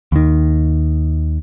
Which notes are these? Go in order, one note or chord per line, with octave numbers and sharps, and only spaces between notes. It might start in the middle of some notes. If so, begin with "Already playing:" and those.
D#2 D#3